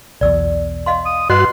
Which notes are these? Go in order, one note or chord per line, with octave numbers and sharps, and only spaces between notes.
B1 E2 B2 D5 E6
D#5 F5 C6
D#6
G2 F#4 B4 D#5 C6 F#6